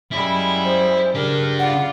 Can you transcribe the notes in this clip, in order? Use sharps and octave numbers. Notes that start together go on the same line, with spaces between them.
F#2 G3 G#3 E4
C5
C#3 D4 G4 A#4
F4 D5 F#5